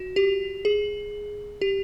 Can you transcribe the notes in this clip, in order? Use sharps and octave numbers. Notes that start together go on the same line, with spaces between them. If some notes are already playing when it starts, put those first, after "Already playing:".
Already playing: F#4
G4
G#4
G4